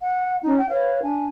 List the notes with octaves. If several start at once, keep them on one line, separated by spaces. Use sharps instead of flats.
F#5
C#4 D#4
G5
B4 C#5 F5
D4 G#5